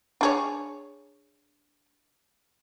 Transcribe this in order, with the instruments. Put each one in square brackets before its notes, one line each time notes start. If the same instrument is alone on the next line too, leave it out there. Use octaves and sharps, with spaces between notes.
[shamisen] D4 G#4 C#5